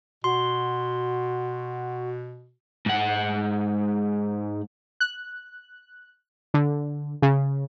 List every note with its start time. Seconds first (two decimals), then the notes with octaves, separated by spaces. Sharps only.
0.24 B2 F#4 C6
2.86 G#2 F#5
5.00 F#6
6.54 D3
7.22 C#3